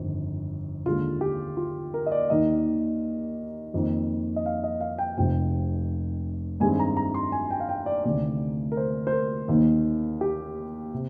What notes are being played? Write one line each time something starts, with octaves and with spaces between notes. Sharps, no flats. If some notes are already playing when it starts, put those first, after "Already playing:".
Already playing: G1 F2 D#3
D#2 D3 G#3 F4
G4
F4
A#4
D#5
D5
D#2 D#3 A#3 D#4 D#5
F2 D#3 A#3
D#5
F5
D#5
F5
G5
F1 F2 C3 G5
G2 D#3 G#3 C4 G#5
A#5
A#5
C6
G#5
G5
F5
G5
D5
D2 C3 D#3 D5
A#4
C5
C5
A#4
D#2 D#3 A#3 D#4
G4
C3